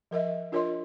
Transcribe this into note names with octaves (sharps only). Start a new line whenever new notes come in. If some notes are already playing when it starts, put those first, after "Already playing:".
F3 A#4 D#5 E5
D4 F4 A#4 C#5 D#5 C6